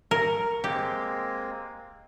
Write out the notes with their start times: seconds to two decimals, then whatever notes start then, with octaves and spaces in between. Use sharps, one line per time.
0.11 A#4 C#6
0.64 G#3 A#3 C4 G4